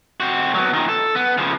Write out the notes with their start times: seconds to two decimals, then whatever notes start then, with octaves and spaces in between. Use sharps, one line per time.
0.20 C4 F#4
0.54 F#3 B3
0.74 A#2 D#3
0.89 A4
1.15 B3
1.38 C#3 F3